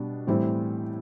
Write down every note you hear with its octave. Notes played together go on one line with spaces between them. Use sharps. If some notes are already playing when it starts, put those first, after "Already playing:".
Already playing: B2 G3 D4
A2 E3 G3 C4 E4